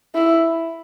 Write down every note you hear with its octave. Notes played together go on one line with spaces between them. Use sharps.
E4